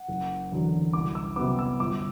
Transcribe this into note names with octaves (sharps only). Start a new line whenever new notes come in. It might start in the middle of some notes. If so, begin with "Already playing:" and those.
Already playing: F#5
F#1
E2 D3 F#3
C2 D6
E6
C3 F#3 B3 D6
E6
G1 D6